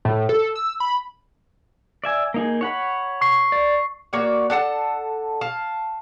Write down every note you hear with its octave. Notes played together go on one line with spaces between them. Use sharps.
A2
A4
E6
B5
D5 E5 G#5
A#3 D#4 G#4
C#5 F#5 B5
C#6 C7
D5
A#3 F#4 C#5 D5
D4 A4 F#5 A5
F5 A5